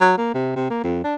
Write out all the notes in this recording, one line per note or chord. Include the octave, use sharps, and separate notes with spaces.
F#3
A#3
C3
C3
A#3
F2
D4